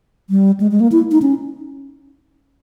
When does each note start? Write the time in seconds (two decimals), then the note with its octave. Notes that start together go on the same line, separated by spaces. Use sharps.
0.30 G3
0.60 G#3
0.71 G#3
0.80 A#3
0.92 E4
1.11 D#4
1.22 C#4